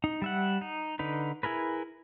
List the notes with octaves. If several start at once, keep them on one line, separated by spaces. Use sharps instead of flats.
D#4
G3 E5 F#5
D#4
D3 D#4 B4
E4 G#4 A#4 B4